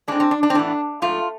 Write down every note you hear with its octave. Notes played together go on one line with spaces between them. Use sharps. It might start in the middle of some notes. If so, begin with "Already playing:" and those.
A2 G#3 C4 D4
C4
D4
D4
C4
A2 E3 B3 D4
G#2 F3 A3 F4